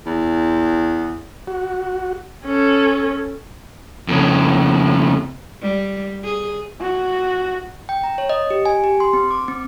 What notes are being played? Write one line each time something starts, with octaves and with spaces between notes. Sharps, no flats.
E2
F#4
C#4 A4
F2 C#3
G3
G#4
F#4
G5
A#5
C#5
D#5
G4
G#5
G4
C6
C4
D6
C4